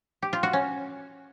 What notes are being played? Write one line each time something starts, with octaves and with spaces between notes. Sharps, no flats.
G4
F4
F#4
C#4